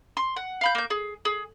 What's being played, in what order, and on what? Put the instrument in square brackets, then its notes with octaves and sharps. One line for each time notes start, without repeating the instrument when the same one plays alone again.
[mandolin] C6
F#5
F5 B5 G6
A#3 G6
G#4
G#4